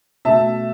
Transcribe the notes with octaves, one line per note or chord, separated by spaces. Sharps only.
B2 A3 E5 A5